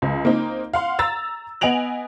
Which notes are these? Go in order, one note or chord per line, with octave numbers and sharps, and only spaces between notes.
C#2
A#3 C4 D#4
F5 F#5 C6
A#5 E6 A6
B3 D#5 G#5 D7 F7 F#7